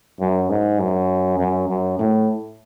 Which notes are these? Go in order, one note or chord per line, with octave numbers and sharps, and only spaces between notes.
F#2
G#2
F#2
F#2
F#2
A2